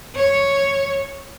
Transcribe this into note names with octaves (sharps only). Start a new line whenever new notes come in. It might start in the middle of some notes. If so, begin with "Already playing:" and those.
C#5